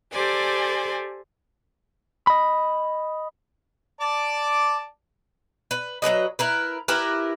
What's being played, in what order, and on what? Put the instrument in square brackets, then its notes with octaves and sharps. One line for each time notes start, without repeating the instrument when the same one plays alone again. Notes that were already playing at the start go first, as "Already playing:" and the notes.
[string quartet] G4 A4 C5 D5 G#5
[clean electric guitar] D#5 B5
[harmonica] D5 A5 D6
[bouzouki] B4
F#3 G3 B4 D#5
E4 A#4 B4
E4 G4 A#4 B4